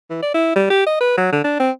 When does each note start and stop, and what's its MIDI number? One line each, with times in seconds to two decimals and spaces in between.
0.10 0.20 52
0.22 0.32 74
0.34 0.51 64
0.56 0.68 55
0.70 0.84 67
0.86 0.97 75
1.00 1.13 71
1.17 1.32 54
1.32 1.40 50
1.44 1.55 62
1.59 1.71 60